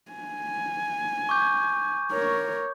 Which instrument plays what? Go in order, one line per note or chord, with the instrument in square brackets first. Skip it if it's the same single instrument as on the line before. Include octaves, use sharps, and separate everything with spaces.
[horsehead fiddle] G#5
[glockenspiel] C#6 D6 G6
[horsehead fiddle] A#4 C#5